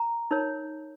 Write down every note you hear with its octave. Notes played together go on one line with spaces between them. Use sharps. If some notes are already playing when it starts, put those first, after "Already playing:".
Already playing: A#5
D#4 A#4 C#5